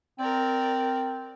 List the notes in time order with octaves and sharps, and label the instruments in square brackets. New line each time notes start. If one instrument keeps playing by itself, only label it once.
[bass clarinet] C4 [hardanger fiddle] A#4 D5